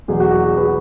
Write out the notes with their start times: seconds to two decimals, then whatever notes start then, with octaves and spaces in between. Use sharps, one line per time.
0.08 E2 B2 F#3 G#4
0.20 F#4
0.32 G#4
0.45 G#4
0.57 F#4 B4